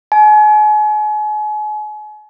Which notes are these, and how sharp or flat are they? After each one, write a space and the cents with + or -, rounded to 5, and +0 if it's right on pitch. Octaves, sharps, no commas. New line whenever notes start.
G#5 +40